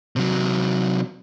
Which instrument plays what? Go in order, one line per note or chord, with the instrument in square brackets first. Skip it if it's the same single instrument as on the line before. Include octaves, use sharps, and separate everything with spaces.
[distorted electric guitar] C3 F#3